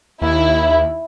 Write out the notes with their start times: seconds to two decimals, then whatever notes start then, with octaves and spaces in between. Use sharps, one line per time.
0.22 D#2 E4